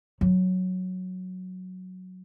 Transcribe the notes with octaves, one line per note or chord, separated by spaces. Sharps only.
F#3